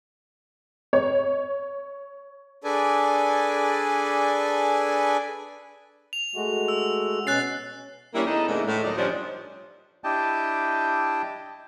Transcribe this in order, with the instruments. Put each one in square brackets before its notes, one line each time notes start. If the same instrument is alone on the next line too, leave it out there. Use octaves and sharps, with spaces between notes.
[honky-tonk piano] C#5
[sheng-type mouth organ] D4 G#4 A4 B4 D5 G#5
[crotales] F7
[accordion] G#3 A3 F#4
[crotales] E6
[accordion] B2 C#4 [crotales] F#6 A6 C7
[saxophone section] G3 A#3 C#4 D4 E4
E2 D#4 E4 A4 D#5
G#2 C#3 E3 A3 A#3 D4
A2 A3
D2 A#2 F#3 D#4 D5 D#5
G2 F3 G3 C#4 D4
[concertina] D4 E4 G4 D#5 G5 A5